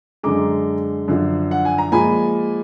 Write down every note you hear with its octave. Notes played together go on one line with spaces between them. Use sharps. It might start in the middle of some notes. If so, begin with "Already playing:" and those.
F#2 D3 G#3 A#5 D6
F#2 D3 F3
F#5
G#5
A#5
A#2 F3 G#3 G#5 B5